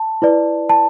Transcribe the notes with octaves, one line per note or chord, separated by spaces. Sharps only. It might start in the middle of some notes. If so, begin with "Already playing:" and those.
Already playing: A5
E4 B4 D5
A5